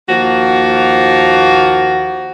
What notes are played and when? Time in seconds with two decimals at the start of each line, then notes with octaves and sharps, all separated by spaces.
0.08 D#2 F3 A#3 F#4